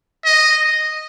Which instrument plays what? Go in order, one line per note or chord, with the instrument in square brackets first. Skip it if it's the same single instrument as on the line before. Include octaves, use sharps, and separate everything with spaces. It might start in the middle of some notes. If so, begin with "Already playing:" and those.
[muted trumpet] D#5